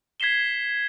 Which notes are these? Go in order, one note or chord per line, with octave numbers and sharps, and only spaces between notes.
G#6 B6 C7 E7 G7